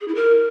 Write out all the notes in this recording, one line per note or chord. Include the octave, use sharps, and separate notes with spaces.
G#4
E4
A#4